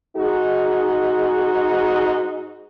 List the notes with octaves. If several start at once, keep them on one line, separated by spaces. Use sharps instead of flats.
G#2 D#4 F#4 G#4